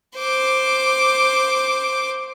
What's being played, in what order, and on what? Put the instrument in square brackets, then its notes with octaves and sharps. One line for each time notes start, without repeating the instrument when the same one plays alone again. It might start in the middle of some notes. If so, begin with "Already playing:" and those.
[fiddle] C5 D6